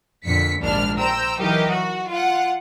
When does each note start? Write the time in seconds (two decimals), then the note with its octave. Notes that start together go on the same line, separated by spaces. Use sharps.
0.24 F2 A#2 D3 B6 C#7
0.61 A#1 D#2 G#2 D4 F6
0.98 C5 G5 A#5 E6
1.38 E3 F#3 D#4 G4 A#4 D#5
1.70 F#4
2.09 F4 F#5